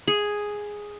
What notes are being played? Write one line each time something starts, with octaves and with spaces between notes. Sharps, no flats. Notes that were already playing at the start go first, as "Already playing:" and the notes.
G#4